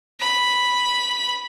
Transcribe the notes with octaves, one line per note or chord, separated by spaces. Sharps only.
B5